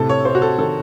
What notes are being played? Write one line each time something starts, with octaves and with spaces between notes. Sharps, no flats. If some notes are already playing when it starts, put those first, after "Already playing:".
Already playing: A2 C3 A4
C#5
C3 C5
F#4
A4
D#3 A4